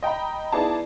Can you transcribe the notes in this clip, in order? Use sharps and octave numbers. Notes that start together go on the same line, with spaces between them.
D#5 G5 A#5 B5
B3 D#4 E4 G#4 D5 A5